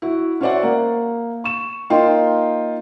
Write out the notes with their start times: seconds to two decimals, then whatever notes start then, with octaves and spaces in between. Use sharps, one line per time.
0.02 E4 F#4
0.41 C#4 F#4 C5 D5 E5 F#5
0.63 A#3
1.44 C#6 E7
1.90 A#3 D#4 F4 G5 C6